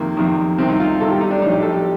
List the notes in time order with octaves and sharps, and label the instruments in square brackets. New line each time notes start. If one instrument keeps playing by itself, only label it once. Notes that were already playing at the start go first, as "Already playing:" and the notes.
Already playing: [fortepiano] F2 C3 D#3 A#3
F2 C3 D#3
C2 C3 D#3 C4
D#4
F4
C2 C3 D#3 A4
G4
D#4
D4
A#1 A2 D#4
G4
A4
G4